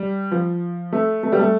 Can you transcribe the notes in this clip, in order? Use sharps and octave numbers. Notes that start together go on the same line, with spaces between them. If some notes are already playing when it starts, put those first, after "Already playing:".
Already playing: G3
F3
A3
A3
G3
A3